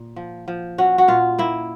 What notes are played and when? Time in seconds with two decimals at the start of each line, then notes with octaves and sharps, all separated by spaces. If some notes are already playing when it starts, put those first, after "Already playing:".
Already playing: A#2
0.16 F3
0.48 F3
0.78 C#4 F#4
0.98 F#4
1.08 A#2 F4
1.38 A#3 E4